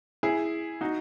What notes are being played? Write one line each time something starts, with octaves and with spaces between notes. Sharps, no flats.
E4 G#4
D#4 F#4